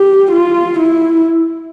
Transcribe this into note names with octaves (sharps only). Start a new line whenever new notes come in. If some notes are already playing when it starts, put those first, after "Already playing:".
Already playing: G4
F4
E4